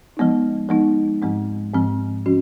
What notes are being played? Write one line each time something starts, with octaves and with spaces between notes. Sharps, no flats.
F3 G#3 B3 D#4
F3 G#3 B3 D#4
G#2 F3 G#3 C4
G#2 F3 G#3 C4
F3 C#4 F#4